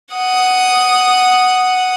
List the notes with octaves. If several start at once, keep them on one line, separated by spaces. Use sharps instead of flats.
F#5 D#6